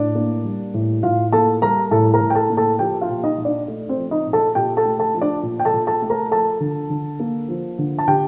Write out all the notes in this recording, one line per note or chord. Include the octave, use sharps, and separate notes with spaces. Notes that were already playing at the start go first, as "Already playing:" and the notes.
Already playing: A2 D4 D5
A#3
G3
A2
A2 F4 F5
A#3 A4 A5
G3 A#4 A#5
A2 A4 A5
A#4 A#5
A2
G5
A4 A5
A#3
A4 A5
F3 G4 G5
F4 F5
A#2
D#4 D#5
A#2
D4 D5
A3
C4 C5
F3
D#4 D#5
A#2
A4 A5
A#2 G4 G5
A4 A5
A3
A4 A5
F3
D4 D5
A#2
G5
A4 A5
A#2
A4 A5
A3
A#4 A#5
F3 A4 A5
D3
D3
A#3
F3
D3
A5
D3 G4 G5